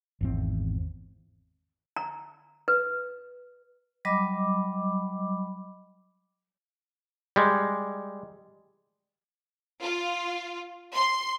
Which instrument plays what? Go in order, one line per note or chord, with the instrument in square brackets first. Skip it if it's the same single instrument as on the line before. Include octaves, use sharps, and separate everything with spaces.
[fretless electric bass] G#1 E2 C4
[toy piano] A#5
B4
[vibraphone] F#3 G3 D#5 B5 D6
[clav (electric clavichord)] G3 G#3
[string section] F4
C6